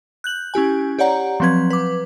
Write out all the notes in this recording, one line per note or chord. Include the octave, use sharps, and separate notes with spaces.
F#6 G6 F#7
C#4 E4 G4 G#5
G4 C#5 D5 F#5 A#5
F3 F#3 C4 B4 G#6
B4 D6